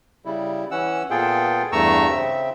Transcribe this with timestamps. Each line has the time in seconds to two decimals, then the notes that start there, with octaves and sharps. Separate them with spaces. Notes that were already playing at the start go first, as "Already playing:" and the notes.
0.25 C#3 G3 E4
0.71 E3 C#4 F#5 E6
1.10 A#2 B3 F4 G#4 A4 G5
1.72 E2 G2 A3 A#5 C#6 E6
2.09 C#3 C4 E5